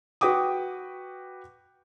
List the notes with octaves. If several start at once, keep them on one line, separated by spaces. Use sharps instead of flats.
F#4 B4 G5 D6 D#6